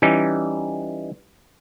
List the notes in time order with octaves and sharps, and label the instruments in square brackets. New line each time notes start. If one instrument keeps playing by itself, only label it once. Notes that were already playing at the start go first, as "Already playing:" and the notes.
[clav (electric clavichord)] E3 G3 C#4 D#4